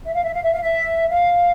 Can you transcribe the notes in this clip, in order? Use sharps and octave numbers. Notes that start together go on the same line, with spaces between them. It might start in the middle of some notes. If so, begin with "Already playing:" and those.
E5
F5
E5
F5
E5
F5
E5
F5